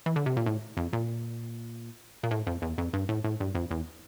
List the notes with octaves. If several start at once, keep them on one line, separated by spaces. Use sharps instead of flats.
E3
D3
C3
A#2
A2
F2
A#2
A#2
A2
F2
E2
F2
G2
A2
A2
G2
F2
E2